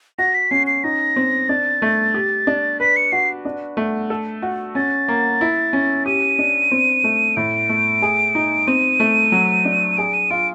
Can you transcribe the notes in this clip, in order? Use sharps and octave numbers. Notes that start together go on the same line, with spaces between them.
F#4 A#6
B6
C#4 C7
C7
D#4 A#6
C4
D4 A6
A3
G4
D4
B4 B6
C#7
F#4 C7
D4
A3
A4
F#4
C#4 A6
A#3
E4
C#4
G4 D#7
D4
C4
A3
A2 D7
A3
G#4
D#4
C4 D#7
A3
F#3
D4
G#4 D7
D#7
F4 D7